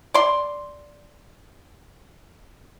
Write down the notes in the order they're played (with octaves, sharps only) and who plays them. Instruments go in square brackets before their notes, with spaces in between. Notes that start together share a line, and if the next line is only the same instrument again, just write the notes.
[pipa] D5 C6